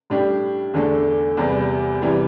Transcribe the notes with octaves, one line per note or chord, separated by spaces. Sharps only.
A2 G3 D4 G4
E2 D3 A3 D4 A4
E2 C3 G3 B3
C3 E3 G3